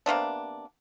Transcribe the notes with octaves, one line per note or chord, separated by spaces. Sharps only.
C3 A#3 B3 D4